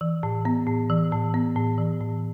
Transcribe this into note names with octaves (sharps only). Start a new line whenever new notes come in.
E3
A2
B3
A2
E3
A2
B3
A2
E3
A2